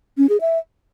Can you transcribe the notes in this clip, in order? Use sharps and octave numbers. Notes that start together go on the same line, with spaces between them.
C#4
G#4
E5